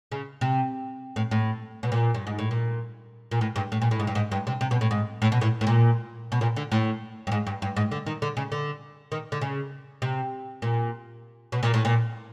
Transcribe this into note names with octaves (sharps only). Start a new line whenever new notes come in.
C#3
C3
A2
A2
B2
A#2
G2
G#2
A2
A#2
A#2
A2
G2
A2
A#2
A2
G#2
G2
G#2
G2
C3
C3
B2
A2
G#2
A2
B2
A2
A2
A#2
B2
A#2
D3
A2
G2
G#2
G2
G2
G#2
D3
D#3
D3
C#3
D3
D#3
D3
C#3
C3
A#2
B2
A#2
A2
A#2